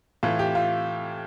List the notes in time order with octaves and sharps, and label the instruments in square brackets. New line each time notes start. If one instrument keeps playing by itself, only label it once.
[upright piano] A2 E3 F4
G4
F4